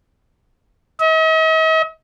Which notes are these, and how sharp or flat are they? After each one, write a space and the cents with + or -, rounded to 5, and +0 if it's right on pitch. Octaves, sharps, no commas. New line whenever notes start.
D#5 +45